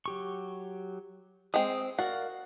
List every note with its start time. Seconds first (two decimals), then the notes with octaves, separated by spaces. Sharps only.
0.06 F#3 G4 C#6
1.54 G#3 C4 D#6
1.99 F#4 A#4 D5 F5